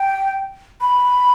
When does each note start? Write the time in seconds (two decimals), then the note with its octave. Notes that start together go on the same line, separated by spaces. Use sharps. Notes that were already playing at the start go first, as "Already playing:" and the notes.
Already playing: G5
0.81 B5